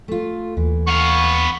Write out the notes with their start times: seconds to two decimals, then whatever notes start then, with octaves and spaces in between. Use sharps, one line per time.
0.08 A3 F4
0.57 D#2 E3
0.87 B3 F5 C#6